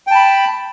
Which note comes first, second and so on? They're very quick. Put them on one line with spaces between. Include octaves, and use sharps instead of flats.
G5 A5 B5